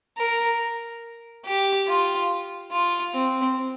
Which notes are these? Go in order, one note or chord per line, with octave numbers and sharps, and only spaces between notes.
A#4
G4
F4
F4
C4